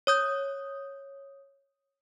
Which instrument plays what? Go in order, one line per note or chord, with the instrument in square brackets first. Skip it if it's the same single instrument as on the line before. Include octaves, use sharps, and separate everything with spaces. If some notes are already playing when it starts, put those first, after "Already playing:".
[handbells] C#5 D#6 G6